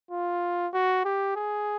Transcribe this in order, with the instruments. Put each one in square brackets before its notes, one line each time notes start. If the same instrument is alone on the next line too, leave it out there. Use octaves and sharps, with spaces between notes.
[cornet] F4
F#4
G4
G#4